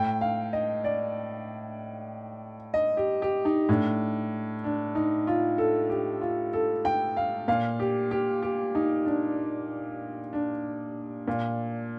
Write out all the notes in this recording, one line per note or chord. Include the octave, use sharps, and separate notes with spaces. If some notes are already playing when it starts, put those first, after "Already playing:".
Already playing: A2 G5
F5
D#5
D5
D#5
G4
G4
D#4
A2 D4
D4
D#4
F4
A4
G4
F4
A4
G5
F5
A#2 F5
G4
G4
G4
D#4
D4
D4
A#2